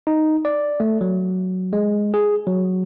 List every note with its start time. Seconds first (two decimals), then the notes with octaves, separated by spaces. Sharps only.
0.07 D#4
0.45 D5
0.80 A3
1.01 F#3
1.73 G#3
2.14 G#4
2.47 F#3